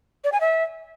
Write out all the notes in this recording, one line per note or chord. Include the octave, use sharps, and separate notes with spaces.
D5
G#5
E5